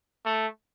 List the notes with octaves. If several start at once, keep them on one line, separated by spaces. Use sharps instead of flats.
A3